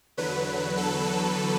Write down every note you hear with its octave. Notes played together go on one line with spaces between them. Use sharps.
E2 D3 F#3 B4
A4